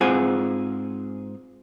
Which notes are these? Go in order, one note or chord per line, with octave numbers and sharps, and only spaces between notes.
G#2 C4 F4 G#4 F#5 G#5